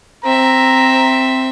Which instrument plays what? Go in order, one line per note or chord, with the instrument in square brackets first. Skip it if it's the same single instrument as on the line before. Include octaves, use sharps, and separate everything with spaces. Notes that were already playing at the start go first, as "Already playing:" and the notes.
[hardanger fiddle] C4 E5 [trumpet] A#5